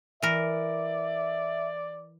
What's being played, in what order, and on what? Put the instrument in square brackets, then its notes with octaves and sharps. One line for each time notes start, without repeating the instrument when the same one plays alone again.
[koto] E3 A#4 [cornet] D5 [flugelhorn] E5